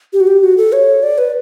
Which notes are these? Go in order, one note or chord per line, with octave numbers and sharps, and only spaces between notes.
G4
F#4
G4
F#4
A4
C#5
D5
B4